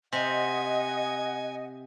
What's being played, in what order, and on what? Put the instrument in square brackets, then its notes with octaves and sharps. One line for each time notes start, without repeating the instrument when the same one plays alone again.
[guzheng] C3 [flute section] D#5 F#5 [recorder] G#5